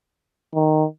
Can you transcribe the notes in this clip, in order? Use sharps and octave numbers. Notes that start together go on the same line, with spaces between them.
D#3